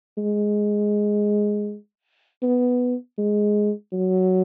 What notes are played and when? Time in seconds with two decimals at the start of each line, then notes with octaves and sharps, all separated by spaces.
0.17 G#3
2.42 B3
3.18 G#3
3.93 F#3